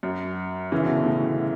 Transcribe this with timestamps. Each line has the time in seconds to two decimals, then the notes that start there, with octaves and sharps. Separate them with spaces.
0.03 F#2
0.72 C#3 E3
0.83 B2 D3
0.95 B2 D3
1.06 A2 C#3